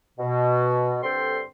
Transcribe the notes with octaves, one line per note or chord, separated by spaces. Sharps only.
B2
G2 D3 C4 A4 G5 C6